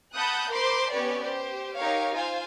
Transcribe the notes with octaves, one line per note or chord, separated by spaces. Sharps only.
F#5 A5 B5 D#6 F#6 G6
A#4 C5 B5 C6 D6 G6
B3 C#4 G4 B4 C#5 D5
G4 C5
D#4 G4 A#4 C#5 F5
F4 C5 F5 G#5